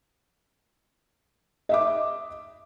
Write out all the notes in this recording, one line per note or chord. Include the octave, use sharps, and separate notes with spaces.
D#5 E5 D6